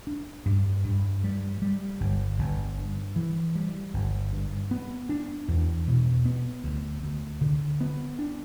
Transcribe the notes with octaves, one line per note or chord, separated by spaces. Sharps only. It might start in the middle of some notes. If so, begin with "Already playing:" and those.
D4
G2
G2
G3
G3
G1
G1
G2
E3
G3
G1
G2
B3
D4
E2
B2
B3
D2
D2
D3
B3
D4